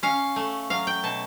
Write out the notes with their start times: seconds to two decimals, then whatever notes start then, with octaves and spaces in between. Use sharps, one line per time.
0.03 C#4 F5
0.36 A3
0.70 F#3 F5
0.87 G5
1.03 B2 A5